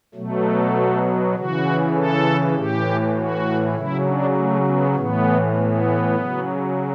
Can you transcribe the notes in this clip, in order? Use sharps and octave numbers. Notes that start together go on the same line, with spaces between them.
B2 F#3 A3
C#3 E3 F#4
A4
A2 E3 G4
F#4
C#3 F#3 E4
D4
A3
B3
A2 E3 B3
B3
C#3 F#3